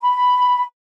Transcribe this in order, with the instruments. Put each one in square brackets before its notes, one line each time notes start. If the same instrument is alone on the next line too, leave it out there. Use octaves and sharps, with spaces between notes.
[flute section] B5